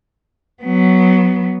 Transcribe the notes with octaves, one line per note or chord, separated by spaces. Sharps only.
F#3 B3